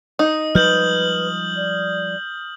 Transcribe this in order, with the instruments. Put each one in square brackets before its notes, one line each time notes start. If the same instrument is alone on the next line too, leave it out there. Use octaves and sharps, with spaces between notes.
[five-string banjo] D#4 [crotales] D#6
[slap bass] F3 G3 G#3 [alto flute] B4 [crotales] F6 G6 F#7
[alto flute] D5